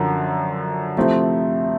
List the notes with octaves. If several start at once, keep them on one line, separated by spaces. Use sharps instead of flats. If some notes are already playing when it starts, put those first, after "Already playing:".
Already playing: F#2 D3 F3
C3 F3 A3 C4 E4